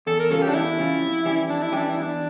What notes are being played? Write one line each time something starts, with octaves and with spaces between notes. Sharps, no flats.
E2 A4
A#4
C#3 G3 C#4 F4 A4
G4
D4
E2 E4
C#3 G3 C#4 F4
F2
E3 G3 C#4 G4
F2 D4
E4
E3 G3 C#4 D4 G4
E4
E2
D4